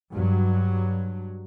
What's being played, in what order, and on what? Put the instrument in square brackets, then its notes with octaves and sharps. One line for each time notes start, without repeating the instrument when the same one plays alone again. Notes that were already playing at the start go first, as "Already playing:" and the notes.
[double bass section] G2 F#3